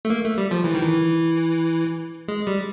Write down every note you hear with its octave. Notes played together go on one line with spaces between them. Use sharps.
A3
A#3
A3
G3
F3
E3
D#3
E3
G#3
G3